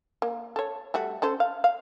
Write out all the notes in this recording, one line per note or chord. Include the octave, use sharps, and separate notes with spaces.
A#3
A4 C#5
G3 A3 F#4
C#4 A4 C5
F5
F5